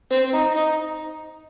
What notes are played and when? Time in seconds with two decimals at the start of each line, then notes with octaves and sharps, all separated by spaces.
0.12 C4
0.34 D#4
0.56 D#4